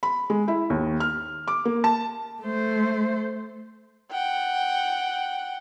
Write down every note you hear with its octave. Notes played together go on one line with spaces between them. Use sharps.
B5
G#3
E4
D#2
F6
D6
A#3
A5
A3 C5
F#5 G5